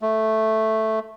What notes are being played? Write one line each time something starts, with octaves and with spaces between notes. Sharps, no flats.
A3